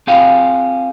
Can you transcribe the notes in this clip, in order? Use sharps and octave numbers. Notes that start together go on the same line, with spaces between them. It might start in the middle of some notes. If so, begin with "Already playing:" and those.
C4 F4 G4 G#4 F5